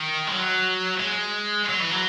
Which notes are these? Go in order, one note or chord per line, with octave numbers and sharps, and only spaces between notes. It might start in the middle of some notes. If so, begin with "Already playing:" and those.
Already playing: D#3
G#3
F#3
G#3
F#3
E3
F#3